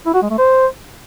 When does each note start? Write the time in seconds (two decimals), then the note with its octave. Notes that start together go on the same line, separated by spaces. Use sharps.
0.06 E4
0.14 F#4
0.22 G#3
0.30 A3
0.38 C5